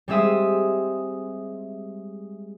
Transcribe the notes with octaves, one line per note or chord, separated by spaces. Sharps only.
G3 G#3 C4 E5 D#6